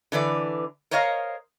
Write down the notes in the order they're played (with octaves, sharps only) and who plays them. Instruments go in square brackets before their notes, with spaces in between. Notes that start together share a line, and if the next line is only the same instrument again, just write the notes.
[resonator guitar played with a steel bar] D3 E3 B4 D5
A#4 C5 C#5 D#5 F5